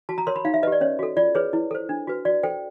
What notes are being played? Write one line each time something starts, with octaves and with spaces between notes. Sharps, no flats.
F#4 A5
A#5
A#4 C#5 C6
B5
D#4 F5
E5
G4 B4 D5 D#5
C#4 C#5
F#4 A4
F4 D5
G#4 B4 C#5
E4
A4 C5
D4
F#4 B4
F#4 D5
A4 C5 G5